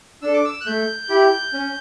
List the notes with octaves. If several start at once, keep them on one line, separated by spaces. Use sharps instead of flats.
D4 A4 E6
D6
E6
F#6
A3 G6
E4 G4
C#4